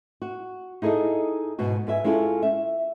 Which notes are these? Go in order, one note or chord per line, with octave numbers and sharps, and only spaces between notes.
F#4
D#4 E4 G#4 A4 D#5
G#2 B2 F#4
G#2 B4 E5 G#5
G#3 C#4 E4 F4 A4 F5
E5